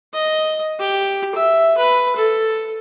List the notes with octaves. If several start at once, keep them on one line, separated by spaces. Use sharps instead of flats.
D#5
G4
E5
B4
A4